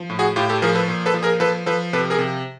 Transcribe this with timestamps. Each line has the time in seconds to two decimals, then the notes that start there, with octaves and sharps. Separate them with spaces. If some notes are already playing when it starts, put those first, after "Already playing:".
Already playing: F3
0.10 A2
0.19 F#4 G#4
0.36 A2 F4 G4
0.49 G4 A4
0.62 F3 G#4 A#4
0.75 A4 B4
0.88 A#2
1.06 A4 B4
1.14 F3
1.23 G#4 A#4
1.40 F3 A4 B4
1.66 F3 A4 B4
1.93 C3 A4 B4
2.10 G#4 A#4
2.19 C3